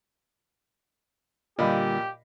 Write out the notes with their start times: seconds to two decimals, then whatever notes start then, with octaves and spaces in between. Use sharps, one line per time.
1.59 A#2 D3 G3 G4 D#5 F5 B5